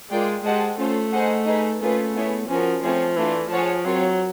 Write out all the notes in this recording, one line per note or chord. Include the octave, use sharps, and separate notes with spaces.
G#3 F4 A#4 D5 G5
G#3 G4 C5 D#5 F#5 A5
A3 C#4 F4 A4 C5
D#4 G#4 C5 D#5 F#5
D#4 G#4 B4
A3 A#3 C#4 F4 G#4 B4
B3 E4 G#4 C#5
F3 C#4 F#4 A#4
F3 A3 C4 F4 G#4 C#5
E3 A3 D4 F4 A4
F3 G#4 C#5 F#5 A5
F#3 C4 F4 A#4 C#5